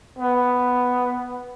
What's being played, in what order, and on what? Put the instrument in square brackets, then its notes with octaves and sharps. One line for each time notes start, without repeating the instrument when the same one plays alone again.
[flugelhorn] B3